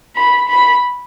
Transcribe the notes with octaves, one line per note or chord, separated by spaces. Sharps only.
B5
B5